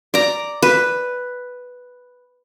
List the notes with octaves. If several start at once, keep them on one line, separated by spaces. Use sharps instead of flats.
D5 A#5
B4